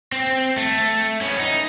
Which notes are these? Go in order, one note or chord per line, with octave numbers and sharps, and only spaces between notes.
C4
A3
B3 C#4
D#4